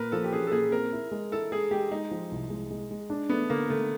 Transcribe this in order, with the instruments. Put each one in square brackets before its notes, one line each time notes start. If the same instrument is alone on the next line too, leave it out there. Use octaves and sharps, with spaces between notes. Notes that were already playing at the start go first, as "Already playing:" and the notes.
Already playing: [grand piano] A#2 [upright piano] A#4 B4
[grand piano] F3 [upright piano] A4
[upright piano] G4
[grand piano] C#4 [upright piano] G#4
[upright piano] A4
[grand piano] A#2 [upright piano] G#4
[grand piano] C4 [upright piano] A#4
[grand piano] E4
G#3
[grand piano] E4 [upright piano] A4
[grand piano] G#3 [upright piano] G#4
[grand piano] G#3 [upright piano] G4
[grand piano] G#3 [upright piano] D#4
[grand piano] F3
C2
G#3
G#3
G#3
D4
[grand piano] A3 [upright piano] B3
[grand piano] D3 [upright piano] A#3
[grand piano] D3 [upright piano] A3